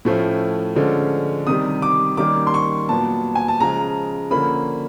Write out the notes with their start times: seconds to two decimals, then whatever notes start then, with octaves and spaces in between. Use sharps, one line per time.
0.05 A2 F3 A3 C#4
0.76 D3 F3 G#3 C#4
1.47 C3 D#3 G3 D#6
1.82 D6
2.17 D#3 G3 A#3 C#4 D6
2.47 C6
2.54 C#6
2.89 A#2 F#3 B3 A5
3.35 G#5
3.48 A5
3.60 C#3 F3 G#3 A#5
4.31 D3 F3 A#3 C#4 B5